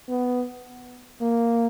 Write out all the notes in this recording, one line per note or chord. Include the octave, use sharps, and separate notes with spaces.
B3
A#3